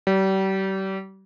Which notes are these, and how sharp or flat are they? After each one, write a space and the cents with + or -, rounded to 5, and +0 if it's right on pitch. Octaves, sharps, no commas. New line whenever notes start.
G3 -35